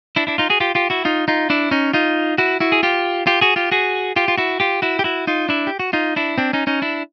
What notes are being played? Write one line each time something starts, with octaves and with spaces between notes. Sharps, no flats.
D4 E4
D4 E4
D#4 F4
F#4 G#4
F4 G4
F4 G4
E4 F#4
D#4 F4
D#4 F4
D4 E4
C#4 D#4
D#4 F4
E4 F#4
E4 F#4
G#4
F4 G4
F4 G4
F#4 G#4
F4 G4
F#4 G#4
F4 G4
F4
E4 F#4
F4 G4
E4 F#4
G4
E4 F#4
D#4 F4
D4 E4
G4
F#4
D#4 F4
D4 E4
C4 D4
C#4 D#4
C#4 D#4
D4 E4